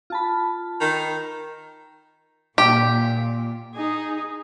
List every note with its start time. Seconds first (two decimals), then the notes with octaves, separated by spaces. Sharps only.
0.10 F4 A5 B5
0.81 D#3
2.58 A#2 G4
3.74 D#4 G#4